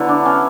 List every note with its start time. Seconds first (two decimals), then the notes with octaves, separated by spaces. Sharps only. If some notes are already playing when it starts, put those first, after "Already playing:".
Already playing: D3 F#3 B3 E4
0.09 D4
0.25 C#4